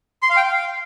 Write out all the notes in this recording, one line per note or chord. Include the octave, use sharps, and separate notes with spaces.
C6
F5
G5
F5